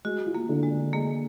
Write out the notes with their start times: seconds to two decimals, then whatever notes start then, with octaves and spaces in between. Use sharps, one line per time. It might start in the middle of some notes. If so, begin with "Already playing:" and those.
0.05 G#3 F#4
0.26 F4
0.35 A#3
0.49 D3
0.63 G#3
0.71 D4
0.93 G#3 A#3